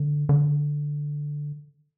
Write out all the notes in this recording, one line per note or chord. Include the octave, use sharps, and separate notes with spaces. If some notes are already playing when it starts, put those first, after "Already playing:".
Already playing: D3
D3